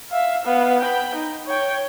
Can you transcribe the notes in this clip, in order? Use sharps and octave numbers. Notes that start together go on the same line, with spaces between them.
E5 F5
B3 F5
G5 B5
D#4
C#5 G5